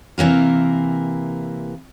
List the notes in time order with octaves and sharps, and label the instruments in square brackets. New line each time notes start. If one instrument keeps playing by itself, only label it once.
[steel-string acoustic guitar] C3 E3 A#3 A#4